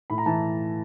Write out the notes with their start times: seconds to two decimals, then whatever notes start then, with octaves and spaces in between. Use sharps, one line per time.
0.10 A2 B5
0.18 A#5
0.26 E3 A5